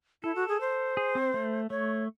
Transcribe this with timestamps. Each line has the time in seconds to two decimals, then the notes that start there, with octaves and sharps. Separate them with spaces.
0.23 E4 A4
0.36 F#4
0.48 G#4
0.61 C5
0.97 G#4
1.15 C4
1.34 A3
1.70 A3 C#5